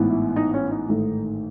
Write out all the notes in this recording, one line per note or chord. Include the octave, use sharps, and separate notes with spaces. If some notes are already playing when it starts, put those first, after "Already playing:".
Already playing: A1 G#2 E3 B3
E4
D#4
C#4
D#4
A1 G#2 D#3 A3